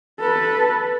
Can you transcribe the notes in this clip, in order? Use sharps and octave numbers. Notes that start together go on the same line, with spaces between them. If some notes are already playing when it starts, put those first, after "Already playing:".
A4 B4